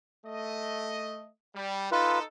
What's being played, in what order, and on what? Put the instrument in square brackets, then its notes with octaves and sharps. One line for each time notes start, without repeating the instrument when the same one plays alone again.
[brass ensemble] A3 D#5
G3
[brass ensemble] D#4 A4 [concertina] F4 B4